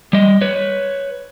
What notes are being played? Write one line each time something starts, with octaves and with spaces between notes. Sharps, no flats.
G3 D#5
B4 C#5